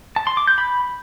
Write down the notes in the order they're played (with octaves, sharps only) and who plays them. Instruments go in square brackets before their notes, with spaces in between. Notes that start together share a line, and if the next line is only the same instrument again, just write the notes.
[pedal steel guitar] A5
C6
D6
G6
B5